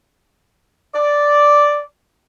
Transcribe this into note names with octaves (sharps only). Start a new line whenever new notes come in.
D5